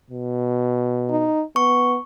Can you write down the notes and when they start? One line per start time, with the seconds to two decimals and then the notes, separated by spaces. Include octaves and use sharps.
0.10 B2
1.11 D#4
1.56 B3 C#6